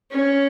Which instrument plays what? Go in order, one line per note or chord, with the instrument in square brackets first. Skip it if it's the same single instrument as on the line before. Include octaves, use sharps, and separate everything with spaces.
[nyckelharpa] C#4